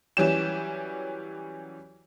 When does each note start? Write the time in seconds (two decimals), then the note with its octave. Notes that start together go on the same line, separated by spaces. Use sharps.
0.17 E3 F#3 G3 C#4 G4 E7